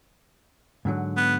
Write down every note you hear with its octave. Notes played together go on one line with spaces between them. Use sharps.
G#2 D3 F#3
B3